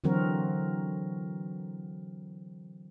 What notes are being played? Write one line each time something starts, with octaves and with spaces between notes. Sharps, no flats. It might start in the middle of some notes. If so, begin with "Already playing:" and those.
D3 E3 F#3 C4 F#4 A#4